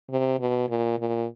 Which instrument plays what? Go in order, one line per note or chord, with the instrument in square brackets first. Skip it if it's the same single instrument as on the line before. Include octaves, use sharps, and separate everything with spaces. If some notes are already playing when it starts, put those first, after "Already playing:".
[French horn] C3
B2
A#2
A#2